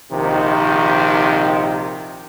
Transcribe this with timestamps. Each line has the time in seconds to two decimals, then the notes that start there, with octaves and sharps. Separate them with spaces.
0.12 A#1 C3 D#3